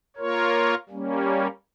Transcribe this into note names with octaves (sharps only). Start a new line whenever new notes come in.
A#3 F4 A#4 C#5
G3 A#3 C#4